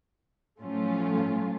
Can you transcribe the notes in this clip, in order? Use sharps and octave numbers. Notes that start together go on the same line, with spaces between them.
A2 F3 F#3 A3 C#4 F4